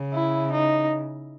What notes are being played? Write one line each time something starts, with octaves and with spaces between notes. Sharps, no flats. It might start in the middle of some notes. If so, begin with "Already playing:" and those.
Already playing: C#3
E4
D#4